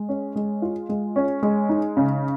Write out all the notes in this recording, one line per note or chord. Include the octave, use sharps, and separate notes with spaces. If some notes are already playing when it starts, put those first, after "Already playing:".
Already playing: G#3
C#4
G#3
F4
G#3
C#4
G#3
D#4
C#3